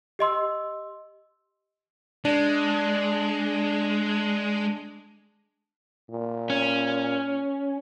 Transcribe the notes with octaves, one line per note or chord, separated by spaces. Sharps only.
G4 D#5 C6 E6
G#3 D4
A#2
C#4